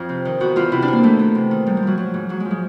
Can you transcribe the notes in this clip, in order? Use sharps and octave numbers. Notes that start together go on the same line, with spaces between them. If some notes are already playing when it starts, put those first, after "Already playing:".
Already playing: F2
C3
D#3
E2 F#4
E2 F4
C3 E4
D4
D#3 A#3
E2 A3
E2
C3
D#3
G#2 G3
G3
F3 F#3
F3 F#3
G#2
G#2 F#3
F3 G#3
G#3